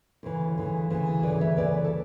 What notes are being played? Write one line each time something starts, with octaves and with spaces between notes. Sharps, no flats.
D2 C#3 E3
D2 C#3 E3
D2 C#3 E3
D2 C#3 E3 B4 D5
C#5 E5
D2 C#3 E3 B4 D5
A4